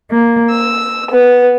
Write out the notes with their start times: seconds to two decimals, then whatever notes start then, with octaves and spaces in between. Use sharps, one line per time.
0.11 A#3
0.51 E6
1.11 B3